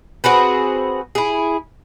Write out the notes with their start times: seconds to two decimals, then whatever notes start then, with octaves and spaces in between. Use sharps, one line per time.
0.24 C4 F#4 G#4 B4
1.15 E4 G#4